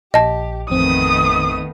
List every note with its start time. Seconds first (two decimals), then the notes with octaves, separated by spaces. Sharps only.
0.14 A#1 G4 D#5 A5
0.70 A1 F2 D#3 A3 B3 C4 D#6